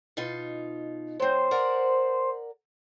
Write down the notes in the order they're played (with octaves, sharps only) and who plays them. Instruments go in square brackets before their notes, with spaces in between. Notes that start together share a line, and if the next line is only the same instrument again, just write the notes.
[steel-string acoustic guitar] B2 D#4 F4
[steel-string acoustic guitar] F#3 C4 [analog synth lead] C5
[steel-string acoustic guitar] A#4 D5 F#5